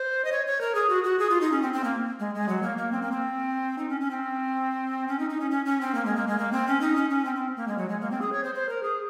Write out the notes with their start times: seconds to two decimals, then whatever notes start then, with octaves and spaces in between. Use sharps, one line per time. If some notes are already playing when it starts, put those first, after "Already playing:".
Already playing: C5
0.25 D#5
0.32 C#5
0.47 C#5
0.61 A#4
0.75 G#4
0.89 F#4
1.04 F#4
1.19 G#4
1.30 F4
1.41 D#4
1.52 C#4
1.62 C4
1.73 C4
1.84 A#3
2.20 G#3
2.35 G#3
2.49 F#3
2.63 A#3
2.78 A#3
2.92 C4
3.02 A#3
3.12 C4
3.78 D#4
3.89 C#4
4.01 C#4
4.11 C4
5.08 C#4
5.19 D#4
5.30 D#4
5.40 C#4
5.51 C#4
5.66 C#4
5.81 C4
5.95 A#3
6.06 G#3
6.16 A#3
6.27 G#3
6.39 A#3
6.52 C4
6.67 C#4
6.81 D#4
6.96 C#4
7.10 C#4
7.25 C4
7.36 C4
7.56 A#3
7.68 G#3
7.78 F#3
7.89 G#3
8.01 A#3
8.11 C4
8.22 G#4
8.32 C#5
8.44 C5
8.55 C5
8.69 A#4
8.83 G#4